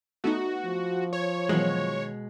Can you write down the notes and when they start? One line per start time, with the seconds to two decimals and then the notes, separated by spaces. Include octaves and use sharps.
0.24 A3 B3 D#4 F#4
0.66 F3
1.13 C#5
1.49 B2 D#3 E3 F#3 G#3